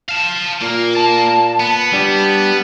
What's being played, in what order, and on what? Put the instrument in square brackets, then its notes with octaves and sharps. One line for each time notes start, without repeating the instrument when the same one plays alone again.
[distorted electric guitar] F5 A5
[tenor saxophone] A#2 [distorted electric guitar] A#3
[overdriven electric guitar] A5
[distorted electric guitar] B3
[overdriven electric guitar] G3 [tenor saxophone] D4